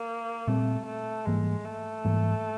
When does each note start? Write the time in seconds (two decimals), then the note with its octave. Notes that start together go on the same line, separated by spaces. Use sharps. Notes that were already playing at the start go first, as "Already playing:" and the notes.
Already playing: A#3
0.47 A#2 G3 A3 C4
0.86 A3
1.26 G#2 E3 G3 G#3 A#3
1.65 A3
2.05 G#2 E3 G3 A#3